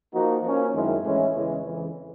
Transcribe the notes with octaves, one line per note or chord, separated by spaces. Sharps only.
F3 A#3 D#4 F#4
F3 A#3 C#4
F#2 D#3 G#3 C4 E4
A2 E3 G#3 C#4 E4
E2 C#3 E3 G#3 C#4
F2 C#3 E3